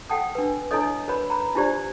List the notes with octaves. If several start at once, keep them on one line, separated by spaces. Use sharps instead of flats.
A4 F#5 G5 A5 D#6
D4 B4
D4 E4 A4 C#5 D#5 D#6
A#4 B4 C#5 B5
A#5 B5
D4 E4 F4 G4 C5 D5